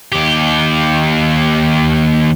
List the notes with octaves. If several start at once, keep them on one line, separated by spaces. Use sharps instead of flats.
D#2 G4